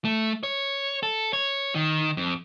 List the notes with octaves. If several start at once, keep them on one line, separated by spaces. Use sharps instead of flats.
A3
C#5
A4
C#5
D#3
F2